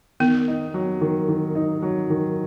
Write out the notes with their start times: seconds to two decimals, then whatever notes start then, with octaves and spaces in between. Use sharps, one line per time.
0.20 D#3 B3
0.48 D#4
0.74 F#3
1.01 D#3
1.28 D#3
1.55 D#4
1.82 F#3
2.10 D#3